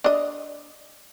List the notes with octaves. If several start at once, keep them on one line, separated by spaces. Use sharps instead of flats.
D4 D#5